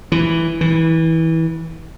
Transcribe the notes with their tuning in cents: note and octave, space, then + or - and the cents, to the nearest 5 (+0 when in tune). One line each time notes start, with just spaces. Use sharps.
E3 +0
E3 -20